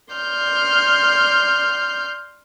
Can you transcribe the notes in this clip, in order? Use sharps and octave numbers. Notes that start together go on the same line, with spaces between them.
D5 C6 F6 G6